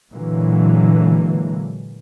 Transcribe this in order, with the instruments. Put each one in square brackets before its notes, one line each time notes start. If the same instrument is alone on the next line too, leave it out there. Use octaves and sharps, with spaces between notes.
[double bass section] A#2 D3 E3 F#3 G#3 A#3